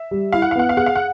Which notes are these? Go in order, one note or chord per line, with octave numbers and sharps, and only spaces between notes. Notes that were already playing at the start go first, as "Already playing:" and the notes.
Already playing: E5
G3
E4 F5
F#5
F5
B3 F#5
F5
G#4 F#5
F5
F#5